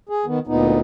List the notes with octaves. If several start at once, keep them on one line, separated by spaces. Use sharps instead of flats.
G#4
D#3 B3
D2 A#2 B3 D#4